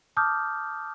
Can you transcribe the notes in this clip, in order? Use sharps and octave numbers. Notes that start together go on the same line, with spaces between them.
A5 D6 D#6 F6 G6